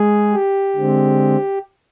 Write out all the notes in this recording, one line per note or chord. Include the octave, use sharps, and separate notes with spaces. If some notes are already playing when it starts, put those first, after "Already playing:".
Already playing: G#3 G#4
G4
D3 G#3 C4